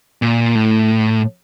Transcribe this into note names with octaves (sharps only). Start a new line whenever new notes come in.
A#2
A2